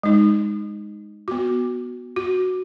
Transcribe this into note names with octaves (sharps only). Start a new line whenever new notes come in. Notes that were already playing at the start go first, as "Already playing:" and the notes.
G#3 D#4
B3 F#4
F#4